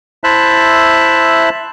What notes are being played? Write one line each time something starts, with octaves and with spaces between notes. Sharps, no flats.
E4 C5 E5 A5 F#6